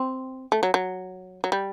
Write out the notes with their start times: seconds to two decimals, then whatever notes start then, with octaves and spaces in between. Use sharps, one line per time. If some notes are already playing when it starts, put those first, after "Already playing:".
Already playing: C4
0.52 A3
0.63 F#3
0.74 F#3
1.44 F#3
1.52 G3